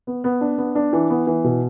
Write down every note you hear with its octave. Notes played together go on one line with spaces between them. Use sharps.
B3
B3
D4
B3
D4
E3
B3
E3
B2